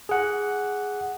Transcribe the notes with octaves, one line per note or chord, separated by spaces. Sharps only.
G#4 F#5